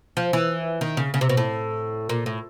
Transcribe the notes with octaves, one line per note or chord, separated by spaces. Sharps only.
F3
E3
D#3
C#3
C#3
C3
B2
A2
A#2
A2